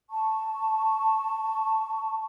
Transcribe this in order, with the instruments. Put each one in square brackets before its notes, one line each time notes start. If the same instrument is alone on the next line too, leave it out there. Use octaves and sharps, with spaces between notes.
[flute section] A5 C#6